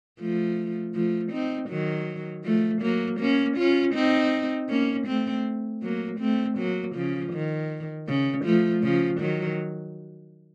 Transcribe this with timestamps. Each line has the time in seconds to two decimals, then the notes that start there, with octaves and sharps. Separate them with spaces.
0.19 F3 A3
0.94 F3 A3
1.31 C4 D#4
1.69 D#3 F#3
2.44 F3 A3
2.82 F#3 A#3
3.20 A#3 C#4
3.57 C#4 F4
3.94 C4 D#4
4.69 A#3 C#4
5.07 A3 C4
5.82 F#3 A#3
6.19 A3 C4
6.58 F#3 A#3
6.95 C#3 F3
7.33 D#3
8.08 C#3
8.45 F3 A3
8.83 C#3 F3
9.20 D#3 F#3